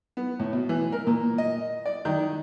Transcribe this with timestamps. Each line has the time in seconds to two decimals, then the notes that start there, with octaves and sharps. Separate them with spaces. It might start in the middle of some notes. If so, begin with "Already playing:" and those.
0.17 B3
0.39 A2
0.53 B2
0.69 E3
0.92 A#4
1.07 A#2
1.38 D#5
1.86 D5
2.05 D#3